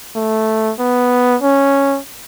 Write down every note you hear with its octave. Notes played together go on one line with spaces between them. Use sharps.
A3
B3
C#4